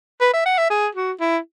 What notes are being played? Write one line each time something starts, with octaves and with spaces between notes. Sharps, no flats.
B4
E5
F#5
E5
G#4
F#4
E4